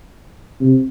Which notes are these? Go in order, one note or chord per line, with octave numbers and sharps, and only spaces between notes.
C3